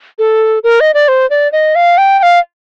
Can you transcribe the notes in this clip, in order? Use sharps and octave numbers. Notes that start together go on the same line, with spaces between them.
A4
A#4
D#5
D5
C5
D5
D#5
F5
G5
G5
F5